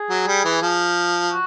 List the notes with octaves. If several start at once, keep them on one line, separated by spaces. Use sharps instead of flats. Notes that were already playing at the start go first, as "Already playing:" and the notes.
Already playing: G#4
F#3
G3
E3
F3
F#4